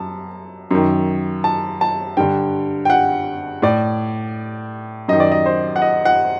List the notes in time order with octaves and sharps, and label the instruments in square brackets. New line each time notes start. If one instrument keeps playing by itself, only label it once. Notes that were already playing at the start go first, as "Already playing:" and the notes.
Already playing: [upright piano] F#2 A5
F#2 D#3
A5
A5
G2 D3 G5
G5
F#5
A2 D5
F#2 D#3 D#5
D5
D#5
C5
F#5
D#5
F#5